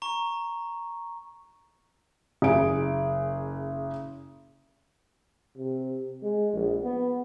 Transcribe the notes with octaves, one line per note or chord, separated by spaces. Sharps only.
A#5 C#6
F#1 G#4 D7
C3
G#3
A#1
B3